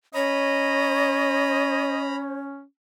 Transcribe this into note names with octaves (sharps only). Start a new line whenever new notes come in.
C#4 C#5 D#5 A#5 B5